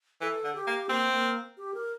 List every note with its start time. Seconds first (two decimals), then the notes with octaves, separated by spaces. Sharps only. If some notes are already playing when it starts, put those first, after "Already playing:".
0.21 E3 A4
0.44 D3
0.55 G4
0.67 A#3
0.89 A#3 C4
1.12 A#3
1.57 G4
1.74 A#4